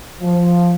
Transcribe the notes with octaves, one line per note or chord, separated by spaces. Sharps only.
F3